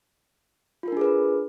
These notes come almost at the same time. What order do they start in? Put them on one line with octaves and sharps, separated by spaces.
F4 A#4 D4 G#4 B4